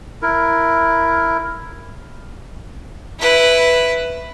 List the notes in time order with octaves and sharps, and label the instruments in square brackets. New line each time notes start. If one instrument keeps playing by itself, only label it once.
[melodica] E4 A#4
[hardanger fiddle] E4 B4